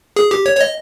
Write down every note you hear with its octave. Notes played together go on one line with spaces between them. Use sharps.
G#4
G4
C#5
C#5
D#5